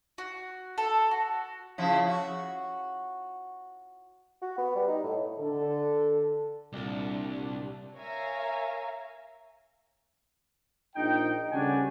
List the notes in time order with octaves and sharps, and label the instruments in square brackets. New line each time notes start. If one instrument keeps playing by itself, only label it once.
[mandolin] F#4
A4
F#4
[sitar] C#3 F3 E4
F#4
[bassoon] F#4
B3
G3
D#4
A2
[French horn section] D3 A4
[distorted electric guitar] C2 [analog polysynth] A#2 G3 D4
[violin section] A#4 C#5 E5 F5 G#5 A#5
[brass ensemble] A#1 D#4 G5
D2 C#3 G3 D4 F#4 G#5